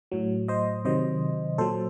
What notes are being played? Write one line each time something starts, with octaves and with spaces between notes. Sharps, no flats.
A2 F#3
C5 D#5
C3 D#3 F#3 C5 D#5
A#2 F#3 A4 C5